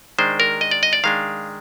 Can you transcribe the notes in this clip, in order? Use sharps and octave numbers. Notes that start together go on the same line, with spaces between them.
D#3 G#3 D4 C5
A#4
D#5
D5
D#5
D5
D#3 G#3 D4 F5